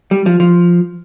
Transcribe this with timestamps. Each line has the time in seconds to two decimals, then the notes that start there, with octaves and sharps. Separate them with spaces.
0.11 G3
0.26 F3
0.40 F3